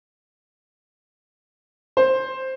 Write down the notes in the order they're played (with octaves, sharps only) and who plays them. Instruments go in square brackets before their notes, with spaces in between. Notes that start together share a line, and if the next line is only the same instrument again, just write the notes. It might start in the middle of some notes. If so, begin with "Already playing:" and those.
[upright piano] C5